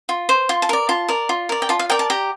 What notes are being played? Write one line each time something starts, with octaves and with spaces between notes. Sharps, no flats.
F4
C5
F4 C6
A5
A#4 D5
F4 A5
A#4 D5
F4
A#4 D5
G5
F4 A5
F5
A#4 D5 G5
A5
G4 A#5